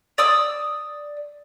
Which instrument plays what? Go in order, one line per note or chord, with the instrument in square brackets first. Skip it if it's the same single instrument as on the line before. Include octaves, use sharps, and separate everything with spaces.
[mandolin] D5 D#6 E6